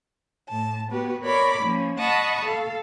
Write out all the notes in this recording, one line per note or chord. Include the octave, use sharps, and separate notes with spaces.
A2 A5
B3 F#4 G4 B4
A#4 C#5 D5 B5 D6
F3 A#3 C#4
D#5 F#5 A5 B5 C#6 D#6
A4 F5